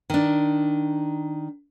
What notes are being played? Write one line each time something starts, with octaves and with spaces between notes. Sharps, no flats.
D#3 D4